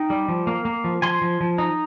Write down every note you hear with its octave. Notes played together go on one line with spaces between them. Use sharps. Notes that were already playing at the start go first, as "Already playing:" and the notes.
Already playing: D#4 G5
G3
F3
A#3
A#3
F3
F3 G#5 C6
F3
F3
D#4